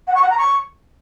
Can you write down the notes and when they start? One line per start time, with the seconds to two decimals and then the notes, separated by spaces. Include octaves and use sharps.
0.07 F#5
0.15 C#6
0.22 F#5
0.30 A#5
0.38 C#6